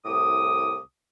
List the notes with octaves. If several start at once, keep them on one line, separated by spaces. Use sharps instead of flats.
C2 A2 D6 D#6